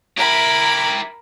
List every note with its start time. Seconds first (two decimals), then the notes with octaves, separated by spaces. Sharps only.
0.17 E4 G4 A#4 B5